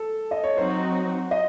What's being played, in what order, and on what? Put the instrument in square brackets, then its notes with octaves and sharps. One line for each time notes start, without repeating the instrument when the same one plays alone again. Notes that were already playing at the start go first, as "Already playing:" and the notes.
Already playing: [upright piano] A4
D#5
C#5
[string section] F#3 C4 D#4 F#4 [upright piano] C5
[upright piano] D#5